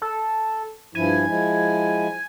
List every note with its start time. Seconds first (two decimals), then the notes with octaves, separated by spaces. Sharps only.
0.02 A4
0.95 G2 F3 E4 G#5
1.27 F3 G#3 E4